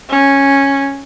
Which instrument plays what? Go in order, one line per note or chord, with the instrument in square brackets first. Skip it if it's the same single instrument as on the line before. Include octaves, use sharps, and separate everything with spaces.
[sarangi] C#4